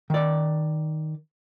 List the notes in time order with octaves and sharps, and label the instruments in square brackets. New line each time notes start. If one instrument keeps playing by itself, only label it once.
[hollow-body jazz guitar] D#3 D5